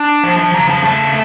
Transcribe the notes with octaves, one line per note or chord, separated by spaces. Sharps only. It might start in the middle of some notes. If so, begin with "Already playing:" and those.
Already playing: D4
F3 A5
A5
C#3 A#5
A5
A3 A5